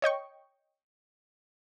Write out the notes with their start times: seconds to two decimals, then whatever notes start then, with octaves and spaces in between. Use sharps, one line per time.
0.02 C#5 D#5 G5 C#6